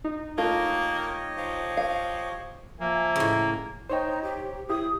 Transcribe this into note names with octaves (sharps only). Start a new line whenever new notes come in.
D#4
A3 A#3 F4 G4 A#4 C#5 D#5
F3
F5
F3 A#3 E5 G#5
A2 C#3
D#4 C5 C#5 G5
G4
E4 G4 D#6